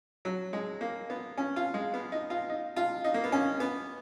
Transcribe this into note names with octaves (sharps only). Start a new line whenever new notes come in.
F#3
G#3
A#3
B3
C#4
F4
G#3
B3
D#4
F4
D#4
F4
D#4
A#3
B3
C#4
B3